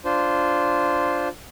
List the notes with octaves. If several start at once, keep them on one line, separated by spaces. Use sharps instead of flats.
D4 F4 C5